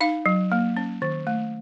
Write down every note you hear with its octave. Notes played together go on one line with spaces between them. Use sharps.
D#4 F5
F#3
A#3
C#4
D#3
A3